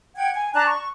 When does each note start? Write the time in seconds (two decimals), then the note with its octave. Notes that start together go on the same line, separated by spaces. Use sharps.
0.15 F#5 G5 G#6
0.34 G#5
0.53 D4 A5 A#5 F#6
0.66 C#6